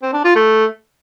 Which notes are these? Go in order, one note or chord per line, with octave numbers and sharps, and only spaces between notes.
C4
D4
F4
A3